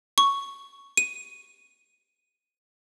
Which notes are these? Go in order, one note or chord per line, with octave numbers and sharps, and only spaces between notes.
C#6
D#7